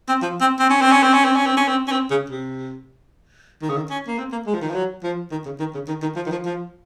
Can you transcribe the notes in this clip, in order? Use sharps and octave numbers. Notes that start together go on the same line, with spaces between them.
C4
F3
C4
C4
C#4
C4
C#4
C4
C#4
C4
C#4
C4
C#4
C4
C#4
C4
C#3
C3
D#3
C#3
D#3
C#4
A#3
C4
A#3
G#3
F3
D#3
F3
F#3
F3
D#3
C#3
D#3
C#3
D#3
D#3
F3
D#3
F3
F3